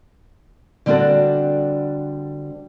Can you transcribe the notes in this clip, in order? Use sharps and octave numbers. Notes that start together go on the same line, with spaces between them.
D3 G3 C4 D4 F#4 A4